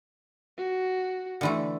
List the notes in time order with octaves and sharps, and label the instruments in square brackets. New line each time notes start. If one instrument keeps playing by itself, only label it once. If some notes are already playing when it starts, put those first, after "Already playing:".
[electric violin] F#4
[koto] D3 E3 A3